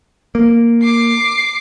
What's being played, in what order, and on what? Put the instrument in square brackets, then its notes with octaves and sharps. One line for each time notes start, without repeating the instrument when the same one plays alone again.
[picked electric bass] A#3
[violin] D6 C7